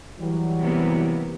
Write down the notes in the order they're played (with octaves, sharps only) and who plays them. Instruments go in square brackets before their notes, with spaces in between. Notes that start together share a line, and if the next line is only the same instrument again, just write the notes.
[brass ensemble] E3 F#3 G3
[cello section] C3 A#3 B3